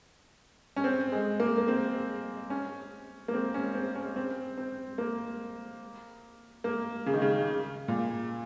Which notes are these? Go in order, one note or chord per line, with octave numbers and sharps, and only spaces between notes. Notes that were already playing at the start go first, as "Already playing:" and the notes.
C#4
C4
G#3
A#3
A#3
C4
C#4
A#3
C4
C#4
C4
C#4
C4
C4
A#3
A#3
C#3
D#3
C#3
A#2